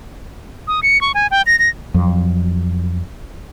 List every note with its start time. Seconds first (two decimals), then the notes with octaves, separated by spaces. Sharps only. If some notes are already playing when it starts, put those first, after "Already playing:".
0.68 D#6
0.83 C#7
1.01 C#6
1.15 G#5
1.31 G5
1.46 A#6
1.59 A#6
1.94 F2 F#3